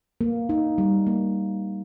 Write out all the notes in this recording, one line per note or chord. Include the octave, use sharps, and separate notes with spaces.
A#3
D#4
G3
A#3